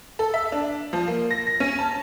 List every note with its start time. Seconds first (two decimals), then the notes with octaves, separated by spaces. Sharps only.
0.19 A4
0.34 E5
0.52 D4
0.93 F3
1.08 A#3
1.31 A#6
1.47 A#6
1.60 C#4
1.79 A5